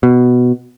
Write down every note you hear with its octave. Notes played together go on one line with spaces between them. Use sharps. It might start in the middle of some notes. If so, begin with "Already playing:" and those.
B2